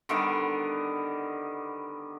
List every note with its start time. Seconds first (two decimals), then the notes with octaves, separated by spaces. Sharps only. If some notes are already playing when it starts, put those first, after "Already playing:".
0.09 D3 D#3 G3 B3